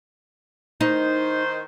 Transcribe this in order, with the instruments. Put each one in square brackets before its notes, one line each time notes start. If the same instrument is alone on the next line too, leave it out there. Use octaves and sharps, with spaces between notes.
[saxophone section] D#3 C5 [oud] D#4